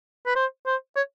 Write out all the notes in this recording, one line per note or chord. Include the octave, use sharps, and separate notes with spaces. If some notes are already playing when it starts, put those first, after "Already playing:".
B4
C5
C5
C#5